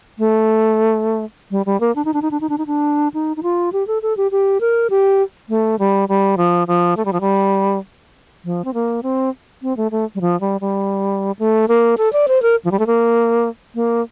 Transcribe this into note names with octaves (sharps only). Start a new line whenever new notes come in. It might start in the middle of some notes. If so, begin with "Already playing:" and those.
A3
G3
G3
A#3
D4
D#4
D4
D#4
D4
D#4
D4
D#4
D4
D#4
D#4
F4
G4
A4
A4
G4
G4
A#4
G4
A3
G3
G3
F3
F3
A3
G3
F3
G3
F3
C4
A#3
C4
C4
A3
A3
G3
F3
G3
G3
A3
A#3
A4
D5
C5
A#4
F3
G3
A3
A#3
A#3